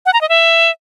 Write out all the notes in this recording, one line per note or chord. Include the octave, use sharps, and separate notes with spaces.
F#5
A#5
D#5
E5